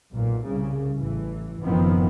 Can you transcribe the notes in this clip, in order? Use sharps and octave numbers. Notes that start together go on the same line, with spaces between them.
B1 A#2
C2 C#3
A1 E3
F#1 A2 D#3 F3 B3 C4